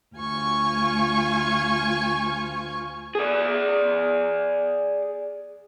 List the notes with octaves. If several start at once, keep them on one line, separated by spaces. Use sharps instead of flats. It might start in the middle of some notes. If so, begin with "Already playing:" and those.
D2 F4 G#5 C#6
G#4 D5